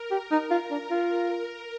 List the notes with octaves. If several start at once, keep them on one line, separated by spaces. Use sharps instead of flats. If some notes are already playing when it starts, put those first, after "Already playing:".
Already playing: A#4
G4 A#4
D#4
F4
D4
F4 A#4